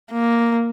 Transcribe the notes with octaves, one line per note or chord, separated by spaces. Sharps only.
A#3